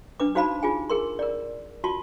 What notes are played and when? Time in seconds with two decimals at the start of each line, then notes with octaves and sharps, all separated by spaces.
0.20 D4 B4 D6
0.35 D#4 F#4 C5 F5 A5 B5
0.63 F4 G#4 G#5
0.90 G#4 A#4 C6
1.19 A#4 D5
1.84 F4 F#4 A5 C6